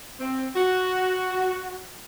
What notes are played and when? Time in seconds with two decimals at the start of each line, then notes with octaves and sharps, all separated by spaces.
0.20 C4
0.56 F#4